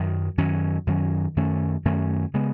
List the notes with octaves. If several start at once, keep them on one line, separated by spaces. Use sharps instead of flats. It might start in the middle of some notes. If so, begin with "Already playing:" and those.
Already playing: F#2 D#3 F#3
F#2 D#3 F#3 C#4
F#2 D#3 F#3 C#4
F#2 D#3 A3 C#4
F#2 D#3 A3 C#4
C#3 G#3 B3